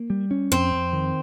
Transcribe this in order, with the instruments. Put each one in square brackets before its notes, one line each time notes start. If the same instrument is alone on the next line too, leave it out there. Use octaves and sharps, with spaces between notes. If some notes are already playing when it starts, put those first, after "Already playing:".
Already playing: [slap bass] A#3
G3
C#4
[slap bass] F2 [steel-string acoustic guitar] C4
[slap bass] F2
D#3